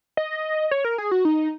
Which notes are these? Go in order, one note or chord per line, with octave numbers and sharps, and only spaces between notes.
D#5
C#5
A#4
G#4
F#4
D#4